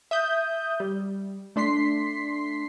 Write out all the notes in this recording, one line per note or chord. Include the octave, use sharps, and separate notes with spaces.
E5 D#6 G6
G3
A3 D4 C6 B6 C7